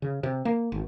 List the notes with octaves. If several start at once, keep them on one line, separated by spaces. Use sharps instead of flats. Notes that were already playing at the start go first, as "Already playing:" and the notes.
C#3
C3
A#3
G#1